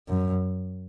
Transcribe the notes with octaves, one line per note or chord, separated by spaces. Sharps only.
F#2